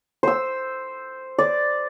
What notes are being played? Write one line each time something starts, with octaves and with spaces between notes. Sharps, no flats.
C5 E6
D5